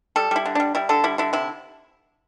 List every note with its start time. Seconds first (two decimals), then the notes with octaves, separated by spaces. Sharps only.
0.16 G3 A4
0.31 G3 E4
0.45 D3
0.55 G3 D4
0.75 G3 E4
0.89 D3 A4
1.04 G3 E4
1.18 D3 E4
1.33 C3 E4